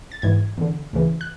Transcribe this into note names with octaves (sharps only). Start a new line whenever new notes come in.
A6
G#2 E3 G#6
E2 D3
D2 C#3 E3
F#6